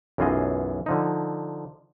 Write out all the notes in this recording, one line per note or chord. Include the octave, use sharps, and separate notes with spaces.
B1 F#2 E3 F4 G#4 D#5
D3 F3 D#4